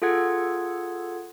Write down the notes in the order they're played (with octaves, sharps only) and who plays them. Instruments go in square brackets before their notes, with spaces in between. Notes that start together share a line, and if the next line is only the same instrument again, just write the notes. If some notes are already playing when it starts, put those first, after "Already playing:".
[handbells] F4 G#4 A4 F#5 G#6